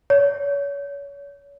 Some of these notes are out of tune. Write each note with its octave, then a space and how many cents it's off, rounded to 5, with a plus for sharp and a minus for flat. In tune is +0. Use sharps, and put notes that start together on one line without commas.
C#5 +35